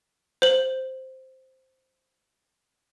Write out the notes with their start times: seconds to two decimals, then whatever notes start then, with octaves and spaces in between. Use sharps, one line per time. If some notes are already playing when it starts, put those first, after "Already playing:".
0.42 C5 F#7